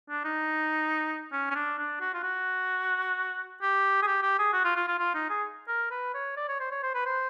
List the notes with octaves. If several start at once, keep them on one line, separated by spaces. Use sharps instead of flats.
D4
D#4
C#4
C#4
D4
D4
F#4
F4
F#4
G4
G#4
G4
G4
G#4
F#4
F4
F4
F4
F4
D#4
G#4
A#4
B4
C#5
D5
C#5
C5
C#5
C5
B4
C5